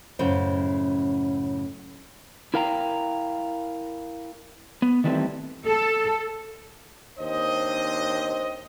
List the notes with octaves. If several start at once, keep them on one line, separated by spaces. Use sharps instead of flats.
F#2 A2 C#3 C5
E4 A#4 F5 G5 A#5
B3
D#3 E3 G3 A3 C4
A4
D#2 C4 D4 C5 D#5